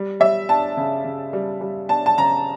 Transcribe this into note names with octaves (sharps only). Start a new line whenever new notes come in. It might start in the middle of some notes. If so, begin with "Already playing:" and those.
Already playing: G3
G3 E5
D4 A5
C#3
C#3
G3
G3
D4 A5
A5
C#3 A#5